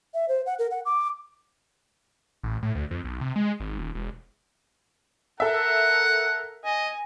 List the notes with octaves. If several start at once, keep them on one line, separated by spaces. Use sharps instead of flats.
E5
C5
F#5
A#4
F#5
D6
A1
A2
D2
F2
B1
C3
G#3
G#1
D#1
E1
A4 A#4 E5 F#5
D#5 G#5